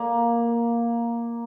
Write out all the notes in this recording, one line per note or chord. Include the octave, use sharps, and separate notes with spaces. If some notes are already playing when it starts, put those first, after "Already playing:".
Already playing: A#3